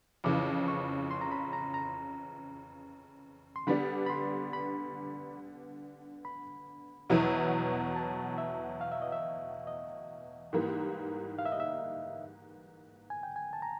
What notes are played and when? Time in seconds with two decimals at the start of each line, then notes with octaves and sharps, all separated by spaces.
0.24 F2 C#3 E3 D6
0.68 C#6
1.11 C6
1.21 A#5
1.31 B5
1.53 A#5
1.74 A#5
3.56 C6
3.67 D3 G3 B3 D4 B5
4.06 B5
4.10 C6
4.53 B5
6.25 B5
7.10 E2 B2 F#3 B3 E4
7.96 A5
8.38 E5
8.81 F5
8.92 E5
9.02 D#5
9.12 E5
9.67 D#5
10.53 G#2 E3 G3 A#3
11.39 F5
11.46 E5
11.52 D#5
11.60 E5
13.10 G#5
13.23 G5
13.36 G#5
13.53 A5
13.62 A#5